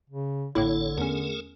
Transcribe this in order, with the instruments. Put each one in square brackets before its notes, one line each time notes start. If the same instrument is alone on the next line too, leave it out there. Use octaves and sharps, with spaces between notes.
[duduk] C#3
[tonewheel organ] A1 A4 C#5 [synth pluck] A2 A#3 E4 [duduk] D3
[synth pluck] E2 C#4 [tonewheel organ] A3 G#4 A#4